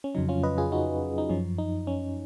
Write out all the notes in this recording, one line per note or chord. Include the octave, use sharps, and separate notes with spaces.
C#4
F2 C#3 F#3 D#4
C#4 F4
B4 D#5
F4 G#4
D#4 F#4
D#4
F#2 F3 C#4
D#4
C#4